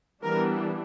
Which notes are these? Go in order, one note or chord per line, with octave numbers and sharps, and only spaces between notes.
E3 G3 B3 D4 A#4